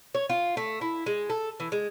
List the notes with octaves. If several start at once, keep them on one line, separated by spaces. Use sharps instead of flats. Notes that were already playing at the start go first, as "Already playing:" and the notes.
C#5
F4
A3
E4
G#3
A4
E3
G#3